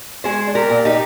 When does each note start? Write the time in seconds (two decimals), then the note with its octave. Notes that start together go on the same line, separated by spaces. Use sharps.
0.24 G#3 G#4 C5
0.47 D4
0.55 G4 A#4
0.69 A#2
0.85 D#4 G4